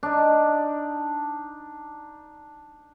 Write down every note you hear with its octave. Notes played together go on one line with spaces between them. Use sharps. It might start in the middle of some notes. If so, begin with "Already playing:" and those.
D4 D#4